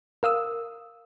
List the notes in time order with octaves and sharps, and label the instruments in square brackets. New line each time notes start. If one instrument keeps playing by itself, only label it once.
[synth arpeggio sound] A#4 F5 D#6 E6